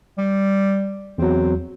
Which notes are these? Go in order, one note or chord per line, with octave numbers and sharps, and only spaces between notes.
G3
E2 F#3 C4